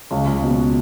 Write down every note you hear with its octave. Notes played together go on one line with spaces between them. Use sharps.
C#2
C#2
B2